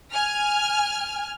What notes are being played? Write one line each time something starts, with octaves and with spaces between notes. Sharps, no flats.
G#5 F6